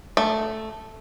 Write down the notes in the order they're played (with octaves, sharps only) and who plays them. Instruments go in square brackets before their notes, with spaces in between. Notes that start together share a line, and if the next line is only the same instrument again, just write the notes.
[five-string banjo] A3